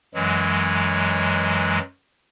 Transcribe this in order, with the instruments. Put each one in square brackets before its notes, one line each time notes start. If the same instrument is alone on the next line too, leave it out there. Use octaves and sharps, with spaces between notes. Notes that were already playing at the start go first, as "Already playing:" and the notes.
[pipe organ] F#2 E3 F#3 G#3